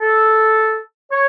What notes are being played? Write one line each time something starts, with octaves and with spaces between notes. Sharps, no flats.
A4
C#5